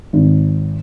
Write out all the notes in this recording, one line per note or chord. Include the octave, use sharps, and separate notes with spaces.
G#1